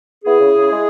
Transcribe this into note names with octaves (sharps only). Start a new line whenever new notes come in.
B3 E4 G#4
C#3
C#3
G#3